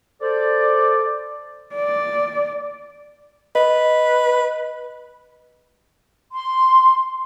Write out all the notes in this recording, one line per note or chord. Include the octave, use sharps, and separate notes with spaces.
A4 C5 D5
D5
B4 D#5
C6